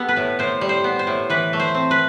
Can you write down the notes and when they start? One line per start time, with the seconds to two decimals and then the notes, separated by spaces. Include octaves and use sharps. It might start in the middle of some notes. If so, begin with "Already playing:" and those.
Already playing: B3 G4 A4
0.09 B4
0.17 A2
0.39 A2 C5
0.61 G3
0.69 C5
0.84 B3
0.99 C5
1.07 A2
1.30 E3 B4
1.53 A3
1.60 C5
1.75 C4
1.91 B4